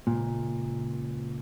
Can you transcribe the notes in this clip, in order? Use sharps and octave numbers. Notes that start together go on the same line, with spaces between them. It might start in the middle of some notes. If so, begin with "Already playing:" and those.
C#2 A#2